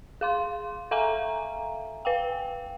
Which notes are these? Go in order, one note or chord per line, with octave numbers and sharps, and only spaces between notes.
G#4 F5 C6
A4 E5 F5 G#5 A#5
B4 F5 G5